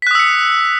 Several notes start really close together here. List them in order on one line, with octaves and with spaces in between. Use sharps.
B6 F#6 D#6 E6 C#7